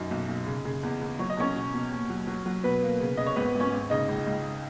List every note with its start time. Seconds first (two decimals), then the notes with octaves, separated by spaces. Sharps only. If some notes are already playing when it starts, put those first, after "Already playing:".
Already playing: F#2 D#4
0.11 B1
0.29 B1
0.46 C#3
0.65 C#3
0.83 E2
1.01 E2
1.19 F#3 C#5
1.30 D#5
1.37 E2 C#4 C#5
1.55 B2
1.74 B2
1.92 D#2
2.10 F#3
2.27 F#3
2.46 F#3
2.63 B2 B3 B4
2.82 A#3
3.00 C#3
3.17 C#3 D#5
3.26 C#5
3.36 G#1 B3 B4
3.55 G#1
3.60 C#4 C#5
3.72 G#1
3.90 C#3 D#4 D#5
4.08 C#2
4.26 C#2